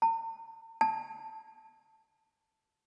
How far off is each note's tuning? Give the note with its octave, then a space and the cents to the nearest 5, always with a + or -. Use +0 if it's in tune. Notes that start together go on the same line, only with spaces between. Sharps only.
A5 +45
A5 +0